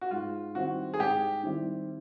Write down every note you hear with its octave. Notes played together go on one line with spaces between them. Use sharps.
F#4
G#2 F4
D#3 G3 C4 E4 F#4
G#4
G#2 G4
D#3 G3 C4 E4